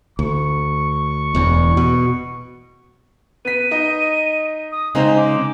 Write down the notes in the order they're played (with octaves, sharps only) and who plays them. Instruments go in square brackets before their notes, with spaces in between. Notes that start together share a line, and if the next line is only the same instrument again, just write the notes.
[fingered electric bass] D2 [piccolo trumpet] C#6
[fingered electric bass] E1 E2
B2
[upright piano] B3 B6 [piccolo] D#7
[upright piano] D#4 D#5
[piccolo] D#6
[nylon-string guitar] C#3 C4 D#4 [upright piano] G#3 C5 [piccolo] A#5
[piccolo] D6